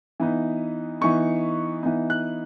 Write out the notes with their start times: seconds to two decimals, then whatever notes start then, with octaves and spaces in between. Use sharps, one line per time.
0.20 E3 B3 D#4
1.01 E3 B3 D#4 C#6
1.83 E3 B3 D#4
2.10 F#6